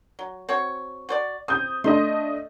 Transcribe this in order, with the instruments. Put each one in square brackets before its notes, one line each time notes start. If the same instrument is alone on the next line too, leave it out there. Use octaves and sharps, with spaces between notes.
[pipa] F#3
C4 F#4 C#5
F#4 C5 D5
[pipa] C4 [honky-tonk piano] D#6 G6
[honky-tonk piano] A3 D4 D#5 [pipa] C6